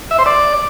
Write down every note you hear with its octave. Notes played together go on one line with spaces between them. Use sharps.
E5
C5
D5